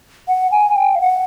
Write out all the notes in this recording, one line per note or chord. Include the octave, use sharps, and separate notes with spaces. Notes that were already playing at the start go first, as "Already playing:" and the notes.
F#5
G#5
G5
F5
F#5